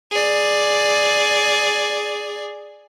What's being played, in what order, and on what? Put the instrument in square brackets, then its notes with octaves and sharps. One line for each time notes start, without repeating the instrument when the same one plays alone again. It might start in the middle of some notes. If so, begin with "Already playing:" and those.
[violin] G#4 D5